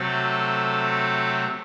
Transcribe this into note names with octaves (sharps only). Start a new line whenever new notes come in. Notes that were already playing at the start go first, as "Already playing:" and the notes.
Already playing: C3 F#3 A3 C4 A4